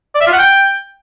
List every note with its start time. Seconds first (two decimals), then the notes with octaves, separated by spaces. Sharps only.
0.15 D5
0.21 E5
0.27 F4
0.33 F#5
0.39 G5